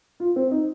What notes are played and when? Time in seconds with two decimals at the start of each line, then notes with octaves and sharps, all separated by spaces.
0.20 F4
0.36 C4
0.51 D#4